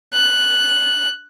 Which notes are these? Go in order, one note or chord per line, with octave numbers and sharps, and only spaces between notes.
F#6